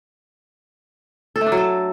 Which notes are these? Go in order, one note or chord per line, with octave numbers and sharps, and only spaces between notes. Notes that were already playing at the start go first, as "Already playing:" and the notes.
A4
A3
D4
F#3
A4